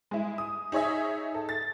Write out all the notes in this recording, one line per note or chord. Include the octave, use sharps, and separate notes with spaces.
G#3 E4
D#6
D#4 G#4 C#5 D#5 E5
A4
A6